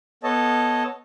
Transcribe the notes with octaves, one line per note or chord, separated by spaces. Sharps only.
B3 A4 C#5 D#5 A5